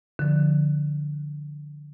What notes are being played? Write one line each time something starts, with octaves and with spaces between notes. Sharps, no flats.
D3 F3